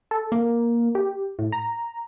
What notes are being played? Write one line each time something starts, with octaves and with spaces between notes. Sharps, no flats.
A4
A#3
G4
A2
A#5